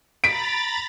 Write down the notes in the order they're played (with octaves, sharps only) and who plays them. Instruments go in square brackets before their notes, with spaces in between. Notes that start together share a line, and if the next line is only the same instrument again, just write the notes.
[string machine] A#5 B5 A6 [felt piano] B6 D7